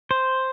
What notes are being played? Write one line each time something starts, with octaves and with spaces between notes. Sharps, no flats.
C5